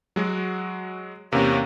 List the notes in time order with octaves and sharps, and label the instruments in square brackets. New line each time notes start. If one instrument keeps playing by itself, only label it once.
[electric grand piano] F#3 G#3 F#4
[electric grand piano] E2 C3 [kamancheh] A#3 C#4